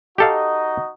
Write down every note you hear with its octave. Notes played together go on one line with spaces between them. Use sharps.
D#4 F#4 G4 A4 D#5 F5